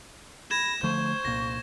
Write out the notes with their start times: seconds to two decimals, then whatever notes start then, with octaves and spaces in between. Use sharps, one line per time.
0.51 B5 G#6 A#6 E7
0.83 D3 F3 A3 C5 C#6
1.25 C2 A#2 A#6